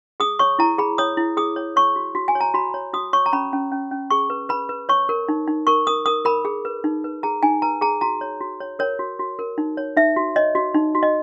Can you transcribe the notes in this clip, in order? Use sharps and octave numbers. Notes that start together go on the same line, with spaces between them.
G#4 D#6
C#5 C#6
E4 A#5
G#4 B5
C#5 D#6
E4
G#4 D#6
C#5
C#5 C#6
F#4
F#4
G#5
C#5
A#5
F#4 B5
C#5
F#4 D#6
C#5 C#6
A#5
C#4 B5
C#4
C#4
C#4
G#4 C#6
B4
B4 B5
B4
C#5 C#6
A#4
D#4
D#4
A#4 C#6
A#4 D#6
A#4 D#6
A#4 B5
G#4
B4
D#4
B4
G#4 A#5
D#4 G#5
B4 A#5
G#4 A#5
F#4 A#5
C#5
F#4
C#5
A#4 C#5
F#4
F#4
A#4
D#4
C#5
D#4 E5
F#4
C#5 D#5
F#4
D#4
F#4
D#5